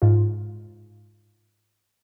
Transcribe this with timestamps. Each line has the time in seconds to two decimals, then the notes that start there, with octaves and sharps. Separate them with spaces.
0.02 G#2 F4